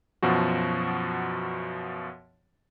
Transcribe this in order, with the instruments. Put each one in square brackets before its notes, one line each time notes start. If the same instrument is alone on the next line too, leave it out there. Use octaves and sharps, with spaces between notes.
[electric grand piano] F#2 B2 F3 F#4